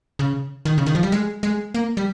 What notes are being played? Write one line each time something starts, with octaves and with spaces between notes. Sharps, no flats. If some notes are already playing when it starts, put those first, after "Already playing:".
C#3
D#3
C#3
D#3
F3
G3
G#3
G#3
A#3
G3